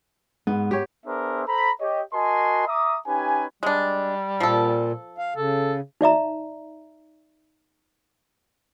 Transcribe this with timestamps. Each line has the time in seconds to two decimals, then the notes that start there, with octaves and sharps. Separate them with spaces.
0.47 G#2 B3
0.71 G4 C#5
1.05 B3 D4 G#4 A#4 C5 E5
1.47 A4 C5 A#5 B5
1.80 G4 C#5 D#5
2.13 F#4 A#4 D#5 G#5 A5 C6
2.67 E5 A#5 D6 D#6
3.07 C#4 D#4 G4 B4 G#5
3.63 G3 G#3 D4
4.40 A#2 F3 A4
5.18 F5
5.36 C#3 A4
6.01 D#4 D5 E5 A#5